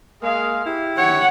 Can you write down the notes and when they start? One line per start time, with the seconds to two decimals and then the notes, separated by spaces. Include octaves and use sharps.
0.22 G#3 A#3 G#4 F5
0.66 E4 G4
0.98 C#5 F#5